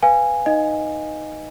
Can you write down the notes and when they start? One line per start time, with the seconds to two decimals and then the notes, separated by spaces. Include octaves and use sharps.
0.03 B4 F5 G#5
0.46 D#4 D#5